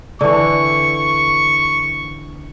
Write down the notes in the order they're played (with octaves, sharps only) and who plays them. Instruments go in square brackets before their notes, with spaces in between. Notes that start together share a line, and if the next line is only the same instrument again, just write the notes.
[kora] D3 E3 [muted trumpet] C#6